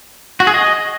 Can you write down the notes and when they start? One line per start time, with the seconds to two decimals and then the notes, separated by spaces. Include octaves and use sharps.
0.40 F#4
0.47 G#4
0.54 D#5